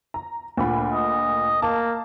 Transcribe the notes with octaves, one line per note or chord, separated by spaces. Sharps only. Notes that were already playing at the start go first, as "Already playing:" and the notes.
A#5
D2 A#2 B5
D#5
A#3 A5